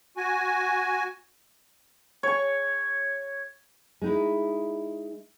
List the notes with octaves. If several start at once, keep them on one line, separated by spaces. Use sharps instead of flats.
F#4 G#5
C#5 C#6
G#3 D#4 E4